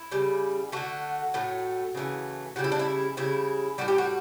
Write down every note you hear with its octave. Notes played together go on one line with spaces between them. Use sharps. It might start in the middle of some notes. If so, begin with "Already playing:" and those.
Already playing: E4
C#3 G3
D3 A3 F#4
A2 F#3 A3
C#3 E3 A3
C#3 G3 F#4
E4
D4
E4
C#3 G3 E4
A2 G3 F#4
G4
F#4